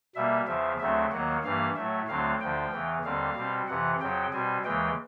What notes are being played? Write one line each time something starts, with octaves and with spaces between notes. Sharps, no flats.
B2 G3 A#3 E5
E2 C#3 F3 E5
D2 C#3 F#3 A3 C4 E5
D#2 D#3 F#3 A#3 F#5
G2 E3 G3 A#3 F5
A2 F#3 A3 E5
D2 D3 F#3 A3 C4 F5
D2 D3 F3 G5
E2 C#3 E3
D#2 D3 G3 C4 F5
B2 G3 C4
F2 C3 E3 F#5
F2 C#3 F#3 G5
B2 G3 C4 G#5
D#2 C#3 E3 G#3 G5